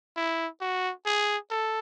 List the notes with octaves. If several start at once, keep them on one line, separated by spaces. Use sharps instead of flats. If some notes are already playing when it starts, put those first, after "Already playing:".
E4
F#4
G#4
A4